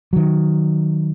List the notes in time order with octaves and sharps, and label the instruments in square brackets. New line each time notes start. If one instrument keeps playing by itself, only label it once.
[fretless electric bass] D#3 F#3